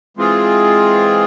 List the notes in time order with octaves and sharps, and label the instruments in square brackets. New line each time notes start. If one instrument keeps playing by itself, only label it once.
[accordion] E3 G#3 C4 F4 G#4